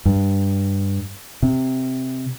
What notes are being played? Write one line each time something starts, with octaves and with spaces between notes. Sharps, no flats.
G2
C3